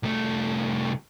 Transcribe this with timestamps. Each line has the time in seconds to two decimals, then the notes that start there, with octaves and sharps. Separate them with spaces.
0.03 C2 A3